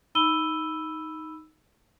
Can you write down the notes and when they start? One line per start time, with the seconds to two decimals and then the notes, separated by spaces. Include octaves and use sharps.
0.15 D#4 B5 E6 D#7 G7